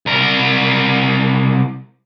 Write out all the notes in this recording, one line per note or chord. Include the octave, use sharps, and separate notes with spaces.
C2 A#4